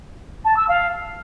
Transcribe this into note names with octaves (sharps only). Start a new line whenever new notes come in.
A5
E6
F5